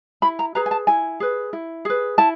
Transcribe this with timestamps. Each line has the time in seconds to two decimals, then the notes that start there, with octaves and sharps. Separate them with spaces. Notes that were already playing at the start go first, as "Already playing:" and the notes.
0.22 E4 B5
0.39 A#5
0.55 G#4 B4 A#5
0.66 G#5
0.71 A5
0.87 E4 G#5
1.20 G#4 B4
1.53 E4
1.85 G#4 B4
2.18 E4 A5